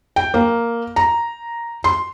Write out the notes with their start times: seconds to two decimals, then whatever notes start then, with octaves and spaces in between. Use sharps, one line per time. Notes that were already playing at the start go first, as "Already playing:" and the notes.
0.16 G5
0.34 A#3
0.96 A#5
1.84 C6